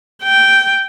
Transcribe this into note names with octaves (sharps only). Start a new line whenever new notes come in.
G5